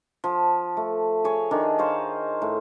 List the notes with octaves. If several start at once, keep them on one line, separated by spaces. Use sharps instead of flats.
F3
A3
G#4 C#5
D#3 D4
C5 C#5 F5
A2